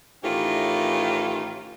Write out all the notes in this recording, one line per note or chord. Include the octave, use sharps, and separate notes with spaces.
A2 D#3 E3 C#4 F4 G4